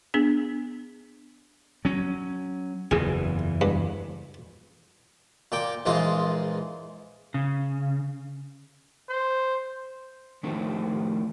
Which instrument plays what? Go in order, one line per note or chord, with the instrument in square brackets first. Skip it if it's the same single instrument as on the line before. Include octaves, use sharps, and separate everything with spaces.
[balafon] B3 D4 G#4
[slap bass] F#3 C#4
[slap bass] F#1 E2 E3 [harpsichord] G#4
[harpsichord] G2
A#2 G5 D6
A#1 E3 G#3 F4
[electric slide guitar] C#3
[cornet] C5
[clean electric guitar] F2 A2 D#3 A3 C4